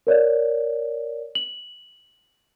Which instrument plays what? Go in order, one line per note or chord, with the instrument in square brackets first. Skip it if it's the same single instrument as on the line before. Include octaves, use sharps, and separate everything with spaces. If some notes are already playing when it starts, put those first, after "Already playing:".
[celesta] A#4 C#5 D5
F#7